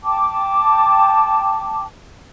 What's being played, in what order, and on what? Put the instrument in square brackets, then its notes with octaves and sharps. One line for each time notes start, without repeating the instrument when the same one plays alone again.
[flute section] G5 A5 D6